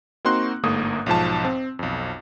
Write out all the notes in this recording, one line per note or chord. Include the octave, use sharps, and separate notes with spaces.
A#3 C4 D#4 F#4 C6 F#6
G1 G#2 A3 A#3 A#4 D#6
B1 G#2 F3 A5
C4
B1 F2